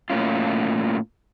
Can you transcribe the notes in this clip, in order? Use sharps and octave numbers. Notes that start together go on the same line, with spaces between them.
A2 A#3 C#4 F4